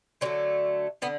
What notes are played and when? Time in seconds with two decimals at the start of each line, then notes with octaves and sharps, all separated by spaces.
0.21 D3 F#3 A3 C#4
1.02 D3 B3